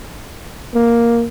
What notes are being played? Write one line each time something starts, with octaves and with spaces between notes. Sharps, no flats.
A#3